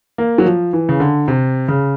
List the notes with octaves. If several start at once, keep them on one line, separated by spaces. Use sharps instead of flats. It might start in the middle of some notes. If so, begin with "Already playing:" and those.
A#3
F#3
F3
E3
C#3
D3
C3
C#3